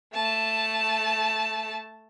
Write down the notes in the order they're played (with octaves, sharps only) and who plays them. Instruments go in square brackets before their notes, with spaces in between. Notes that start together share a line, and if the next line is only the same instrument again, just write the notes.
[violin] A3 A5